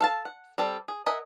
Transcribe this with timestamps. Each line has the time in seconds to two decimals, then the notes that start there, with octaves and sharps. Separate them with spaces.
0.01 A4 F5 A5
0.25 F#5
0.58 G3 C4 A4
0.88 G#4
1.06 A#4 D#5 E5 F#5 G#5